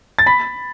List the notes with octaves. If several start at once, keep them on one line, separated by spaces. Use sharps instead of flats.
A6
B5 B6